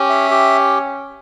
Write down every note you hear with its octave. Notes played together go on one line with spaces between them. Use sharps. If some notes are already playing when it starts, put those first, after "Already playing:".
Already playing: C#4 G4
E5
G4